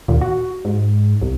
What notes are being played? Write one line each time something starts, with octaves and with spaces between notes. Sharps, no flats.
D#2 A#2
F#4
G#2
C2